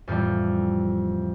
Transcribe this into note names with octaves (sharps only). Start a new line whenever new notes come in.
F2 A2 E3 G3